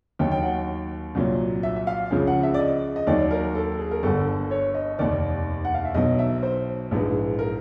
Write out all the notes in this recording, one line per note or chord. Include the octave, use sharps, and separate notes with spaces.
D#2 D#3 F#3 G5
G5
F#5
C2 A#2 F#3
E5
E5
F5
C#2 C#3 F3
F#5
E5
D5
D#5
D#5
D#2 D#3 F#3 D5
A#4
A4
G#4
A#4
G1 G2 D3 A4
C#5
D#5
F1 D#2 D#3 D5
F#5
F5
E5
B1 B2 F#3 D#5
E5
C5
A#1 G#2 E3
A#4